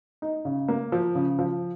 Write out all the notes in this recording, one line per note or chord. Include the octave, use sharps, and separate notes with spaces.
D#4
C#3
A#3
F3
C#3
F3